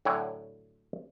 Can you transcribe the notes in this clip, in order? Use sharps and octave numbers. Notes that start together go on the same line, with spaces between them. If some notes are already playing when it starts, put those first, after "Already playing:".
A2 D3 F#3 G5 G#5